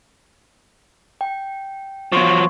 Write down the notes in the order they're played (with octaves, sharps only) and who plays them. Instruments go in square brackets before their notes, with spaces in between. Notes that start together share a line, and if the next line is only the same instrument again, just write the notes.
[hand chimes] G5
[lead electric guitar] F3 F#3 [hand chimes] B3 C6 C#6